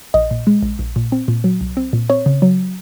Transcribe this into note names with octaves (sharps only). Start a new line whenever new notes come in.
A#1 D#5
A#2
G#3
A#1
A#1
A#2
C4
A#2
F#3
C2
C4
A#2
C4 C#5
C#3
F#3